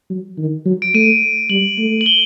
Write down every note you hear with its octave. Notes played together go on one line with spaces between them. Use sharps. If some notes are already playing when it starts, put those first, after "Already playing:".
F#3
D#3
F#3
D7
A3 D#7
G3 F#7
A3
F#7
G7